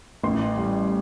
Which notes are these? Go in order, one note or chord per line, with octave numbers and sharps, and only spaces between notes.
A1 C6
G3